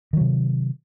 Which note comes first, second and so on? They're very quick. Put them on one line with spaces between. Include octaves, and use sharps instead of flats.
D#3 F#3 C3